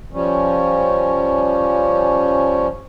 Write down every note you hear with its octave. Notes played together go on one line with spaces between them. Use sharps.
F3 G3 C#4